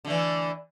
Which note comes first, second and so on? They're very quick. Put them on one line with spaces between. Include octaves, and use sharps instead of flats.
D3 A3 E3